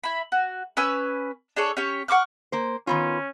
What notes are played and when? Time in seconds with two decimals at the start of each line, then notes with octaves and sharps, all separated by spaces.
0.04 E4 B5
0.32 F#4
0.77 C#4 B4 G#5 E6
1.56 D4 G#4 A4 C#5
1.77 C#4 G4 C#5
2.08 F#5 C#6 D6 F6
2.52 A#3 C5
2.87 D#3 B3 C#4 F4